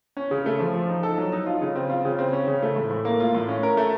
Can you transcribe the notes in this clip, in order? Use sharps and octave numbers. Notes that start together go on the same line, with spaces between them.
C#4
C#3
A3
F3
F3
D#4
A4
F#3
D#4
F4
C#3
C4
F4
C#3
C4
C#4
C#3
A3
A2
A2
A#3
F4
A2
C#4
A#4
A3